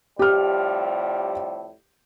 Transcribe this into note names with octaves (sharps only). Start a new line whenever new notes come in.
F2 A2 G3 G4 F6